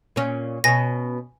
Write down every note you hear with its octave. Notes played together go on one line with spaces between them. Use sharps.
A#2 C#4
B2 C#4 G#5 A#6